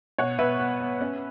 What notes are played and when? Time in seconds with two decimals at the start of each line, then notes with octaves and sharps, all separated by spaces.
0.18 B2 C#5 F#5
0.39 B2 B4 E5
0.60 B3
0.80 B3
1.01 C#4